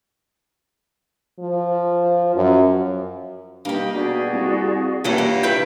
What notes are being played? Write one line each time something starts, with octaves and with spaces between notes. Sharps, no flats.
F3
F#2
G2 A#3 D#4 G4
B2 F#4 G#4 D5
C2
G2 A#2 E3 C#4 F#5 A#5
A#3
E3 B4 E5 G5